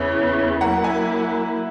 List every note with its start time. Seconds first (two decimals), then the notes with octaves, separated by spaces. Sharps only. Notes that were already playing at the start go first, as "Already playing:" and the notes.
Already playing: E2 C#3 E3 E5 G#5
0.61 F#3 A#3 E4 F#5 A#5
0.84 E5 G#5